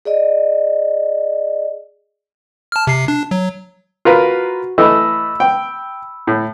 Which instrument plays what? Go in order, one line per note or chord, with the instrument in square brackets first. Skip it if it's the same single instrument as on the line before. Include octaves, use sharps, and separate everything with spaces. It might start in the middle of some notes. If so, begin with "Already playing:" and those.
[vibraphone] G#4 D5 D#5
[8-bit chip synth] A5 F6
C3 C7
D4
F#3
[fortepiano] F4 A#4 B4 [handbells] F#4
[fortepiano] E3 A3 D#5 [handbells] B5 E6
[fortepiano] G5
A2